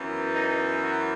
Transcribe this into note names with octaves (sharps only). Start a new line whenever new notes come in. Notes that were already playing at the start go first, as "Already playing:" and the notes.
Already playing: F#2 E3 B3
D#4
F#4